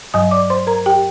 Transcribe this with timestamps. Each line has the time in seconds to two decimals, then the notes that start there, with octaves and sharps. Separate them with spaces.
0.14 G2 F#3 D#5 D#6
0.31 D5 D6
0.50 C5 C6
0.67 A#4 A#5
0.86 G4 G5